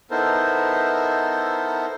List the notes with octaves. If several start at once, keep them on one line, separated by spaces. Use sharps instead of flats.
B3 D#4 E4 A4 A#4 C5